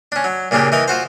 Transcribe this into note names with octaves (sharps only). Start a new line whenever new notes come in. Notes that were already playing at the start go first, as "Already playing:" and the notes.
C#4 D4
F#3
A#2 C#3 A#3 D4 G4
E3 D#4 A#4
F4 F#4 C5